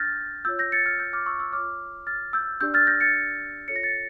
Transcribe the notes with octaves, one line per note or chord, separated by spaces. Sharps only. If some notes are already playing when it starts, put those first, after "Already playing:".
Already playing: D4 F6 G6 A6 A#6
F4 C#5 E6 G6
G6 A#6
A6 C#7
F6 A6
E6 G6
D6 F6
C#6 E6
C#6 E6
F4 C#5 D6 F6
F6 A6
E6 G6
D4 G4 D5 E6 G6
F6 A6
G6 A#6
A6 C#7
F4 A4 C#5 C#7
A#6
A6 C#7